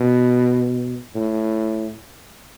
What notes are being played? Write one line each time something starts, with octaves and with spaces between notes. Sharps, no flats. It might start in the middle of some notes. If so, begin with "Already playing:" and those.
Already playing: B2
A2